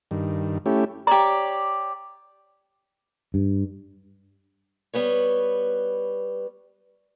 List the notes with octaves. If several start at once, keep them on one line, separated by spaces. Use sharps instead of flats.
G2 D#3
A3 C#4 E4 G4
G4 C#5 D5 A#5
G2
G3 B3 B4 C#5